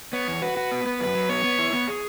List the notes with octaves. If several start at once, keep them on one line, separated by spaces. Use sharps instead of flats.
B3 C#5
E2
F#4 B4
F#4
B3
B3
F#2 B4
F#3
B3 C#5
B3
E4
B3
G#4